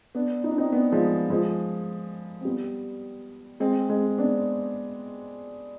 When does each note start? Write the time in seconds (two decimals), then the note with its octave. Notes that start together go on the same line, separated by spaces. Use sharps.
0.15 B3 D4
0.44 D#4
0.51 D4
0.58 C4 D#4
0.72 B3 D4
0.92 F3 G#3
1.30 F3 G#3
2.41 C4
2.45 G3 B3
3.60 G#3 C4
3.89 G#3 C4
4.18 B3 D4